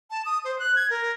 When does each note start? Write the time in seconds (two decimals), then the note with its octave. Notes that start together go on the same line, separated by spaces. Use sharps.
0.11 A5
0.25 D#6
0.45 C5
0.59 F#6
0.76 G#6
0.90 A#4